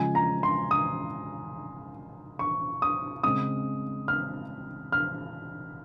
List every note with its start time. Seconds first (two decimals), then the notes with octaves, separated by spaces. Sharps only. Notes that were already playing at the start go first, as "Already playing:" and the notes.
Already playing: C#3 F3 G#3 G#5
0.15 A#5
0.43 C6
0.71 D#6
2.39 C#6
2.82 D#6
3.23 C#3 G#3 C4 D#6
4.08 F6
4.92 F6